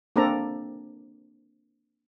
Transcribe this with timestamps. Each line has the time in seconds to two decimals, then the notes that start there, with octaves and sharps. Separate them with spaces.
0.16 A#3 C4 D4 A4 D5 A#5